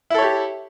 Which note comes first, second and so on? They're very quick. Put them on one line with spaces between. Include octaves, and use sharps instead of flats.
E4 A4 C#5 G4